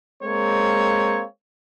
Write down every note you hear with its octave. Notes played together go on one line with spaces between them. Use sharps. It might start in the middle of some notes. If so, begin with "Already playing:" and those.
G#3 A#3 C4 C#5